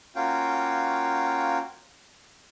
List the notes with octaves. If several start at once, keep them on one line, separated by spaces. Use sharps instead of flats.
A#3 C#4 F4 F#4 F5 G5